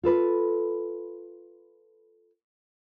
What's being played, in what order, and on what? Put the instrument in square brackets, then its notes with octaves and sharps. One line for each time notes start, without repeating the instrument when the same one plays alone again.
[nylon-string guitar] F4 A4 B4